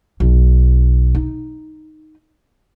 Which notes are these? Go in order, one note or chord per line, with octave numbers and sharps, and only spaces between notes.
B1
D#4